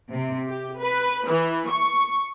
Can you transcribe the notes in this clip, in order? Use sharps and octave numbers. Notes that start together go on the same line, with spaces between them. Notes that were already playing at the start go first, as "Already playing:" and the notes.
C3
G4
B4
E3
C#6